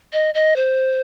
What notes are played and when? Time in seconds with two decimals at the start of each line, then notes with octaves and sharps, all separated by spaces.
0.13 D#5
0.34 D#5
0.56 C5